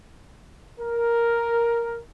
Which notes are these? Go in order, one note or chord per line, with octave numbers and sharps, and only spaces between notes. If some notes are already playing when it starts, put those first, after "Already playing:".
A#4